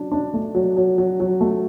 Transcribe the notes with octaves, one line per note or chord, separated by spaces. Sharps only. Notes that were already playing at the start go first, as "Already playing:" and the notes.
Already playing: F#3 D4
D4
A3
F#3
F#3
F#3
F#3
A3